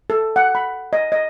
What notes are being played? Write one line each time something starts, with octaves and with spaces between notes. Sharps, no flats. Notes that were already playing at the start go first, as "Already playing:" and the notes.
A4
F#5
B5
D#5
D#5